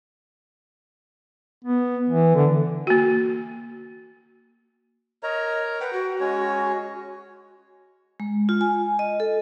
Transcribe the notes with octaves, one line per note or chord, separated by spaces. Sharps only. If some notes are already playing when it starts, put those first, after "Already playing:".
B3
E3
D3
A#3 F#4
A#4 C#5 D#5 A#5
B4 F#5 G5
F#4
G#3 C#4 C#5
G#3
F4
G#5
D#5
A4